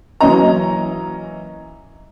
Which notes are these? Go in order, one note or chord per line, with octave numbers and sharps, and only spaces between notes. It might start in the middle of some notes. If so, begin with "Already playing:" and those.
E3 F#3 A#3 C#4 D#5 A#5